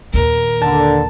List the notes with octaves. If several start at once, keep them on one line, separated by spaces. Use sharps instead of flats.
D#2 A#2 A#4
D3 A5